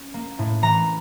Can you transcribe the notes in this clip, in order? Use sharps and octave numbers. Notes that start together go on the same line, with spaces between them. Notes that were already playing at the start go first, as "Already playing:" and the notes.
Already playing: C#4
A#3
A2
E3 A#5